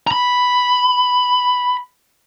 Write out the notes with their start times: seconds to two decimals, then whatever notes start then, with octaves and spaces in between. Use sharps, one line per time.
0.07 A#5 B5